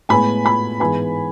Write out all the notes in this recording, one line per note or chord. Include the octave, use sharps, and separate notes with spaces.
A2 G#3 B3 G#5 B5
G#5 B5
G#2 E3 B3 G#5 B5